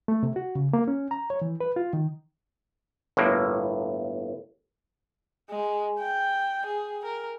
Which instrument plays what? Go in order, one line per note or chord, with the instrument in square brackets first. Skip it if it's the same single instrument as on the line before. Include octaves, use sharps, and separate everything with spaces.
[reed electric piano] A3
C3
F#4
C#3
A#3
C#4
A#5
C#5
E3
B4
F4
D#3
[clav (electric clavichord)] G1 A2 A#3
[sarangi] G#3
G5
G#4
A#4